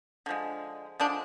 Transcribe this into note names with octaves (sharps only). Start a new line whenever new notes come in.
D3 F3 G#3
D3 F3 G#3 D4